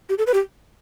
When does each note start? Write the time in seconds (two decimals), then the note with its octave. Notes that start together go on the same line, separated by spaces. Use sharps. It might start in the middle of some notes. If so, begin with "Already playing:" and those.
0.09 G4
0.18 A4
0.27 B4
0.34 G4